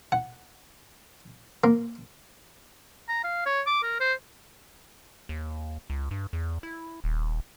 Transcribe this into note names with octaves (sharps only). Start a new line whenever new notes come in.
F#5
A#3
A#5
F5
C#5
D6
A#4
C5
D#2
C#2
G2
E2
E4
D#1